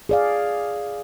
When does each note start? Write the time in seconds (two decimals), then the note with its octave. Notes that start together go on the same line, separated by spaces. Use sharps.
0.09 G#4 D5 F5